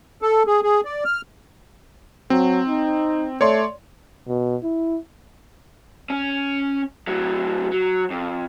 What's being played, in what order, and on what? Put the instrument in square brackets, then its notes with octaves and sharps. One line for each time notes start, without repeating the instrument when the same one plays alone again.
[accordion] A4
G#4
G#4
D5
F6
[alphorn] F#3 [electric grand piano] C4
[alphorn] D#4
[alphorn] A3 [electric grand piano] C#5 D5 C6
[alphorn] B2
E4
[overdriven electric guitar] C#4
A2 F#3
F#3
F2